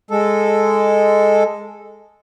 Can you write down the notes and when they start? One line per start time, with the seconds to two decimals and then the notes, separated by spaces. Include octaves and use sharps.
0.11 G#3 A4